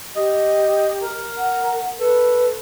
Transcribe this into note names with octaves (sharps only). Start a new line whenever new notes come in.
G4 D#5
A#4
F#5
A4 B4